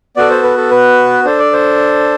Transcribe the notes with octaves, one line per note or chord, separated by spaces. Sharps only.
B3 F#4 A4 D5
C5
B4
A4
B4
D4 A4 C5
D5
C5